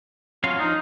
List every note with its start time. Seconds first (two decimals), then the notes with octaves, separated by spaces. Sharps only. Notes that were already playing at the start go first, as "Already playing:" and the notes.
0.44 F#3 C#4 F4 F5
0.59 F3 D4 D#4